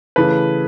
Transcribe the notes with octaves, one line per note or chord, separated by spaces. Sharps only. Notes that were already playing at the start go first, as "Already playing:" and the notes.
C#3 E3 A3 B4